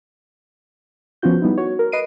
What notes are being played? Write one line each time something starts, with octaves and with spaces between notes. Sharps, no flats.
F3 B3 C#4 F4 F#4 G6
G3 B3 D#4 E4
F#4 C#5
A#4
B4 D#5 C7 D7 D#7